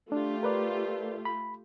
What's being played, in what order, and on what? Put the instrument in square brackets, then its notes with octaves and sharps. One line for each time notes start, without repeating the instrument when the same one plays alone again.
[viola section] A3 F4 G4 [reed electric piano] D4
[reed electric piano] A#4 B4 D5
B5